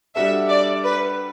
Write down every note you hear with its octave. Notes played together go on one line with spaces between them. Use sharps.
G3 D4 F#4 A4 E5
D5
B4